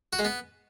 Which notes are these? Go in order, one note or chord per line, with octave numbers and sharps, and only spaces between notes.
F#4
G#3
B3